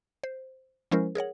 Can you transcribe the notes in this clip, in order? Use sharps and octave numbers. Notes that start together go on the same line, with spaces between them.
C5
F3 G#3 C#4 E4 A#4 C5
G#4 A#4 C#5 F#5